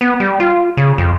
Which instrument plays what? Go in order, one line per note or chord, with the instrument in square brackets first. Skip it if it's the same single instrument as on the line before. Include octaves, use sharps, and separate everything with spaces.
[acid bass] B3
G3
F4
C#3
F2